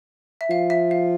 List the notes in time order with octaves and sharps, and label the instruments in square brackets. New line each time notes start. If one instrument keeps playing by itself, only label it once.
[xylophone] E5
[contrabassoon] F3 [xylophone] F5
[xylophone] E5
F5